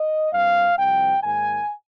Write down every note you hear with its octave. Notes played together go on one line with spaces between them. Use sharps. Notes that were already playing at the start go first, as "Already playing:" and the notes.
Already playing: D#5
G2 G3 C4 F5
C2 C3 F3 C4 G5
G#2 D#3 A#3 G#5